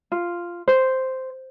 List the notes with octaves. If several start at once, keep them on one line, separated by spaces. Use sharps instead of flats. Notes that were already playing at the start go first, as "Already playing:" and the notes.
F4
C5